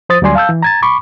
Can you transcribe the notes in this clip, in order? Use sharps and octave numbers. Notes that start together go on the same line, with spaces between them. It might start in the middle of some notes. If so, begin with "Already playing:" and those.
F3 C5 D#6 A6
D2 F#3 G3 D5 G#5 C6
F5 A5 E6 G6
E3
A#5 G#6 A6
B5 C#6 D6